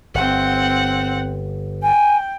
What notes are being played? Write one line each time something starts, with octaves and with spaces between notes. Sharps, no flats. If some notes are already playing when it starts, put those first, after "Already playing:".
G1 C4 F#5
G5 G#5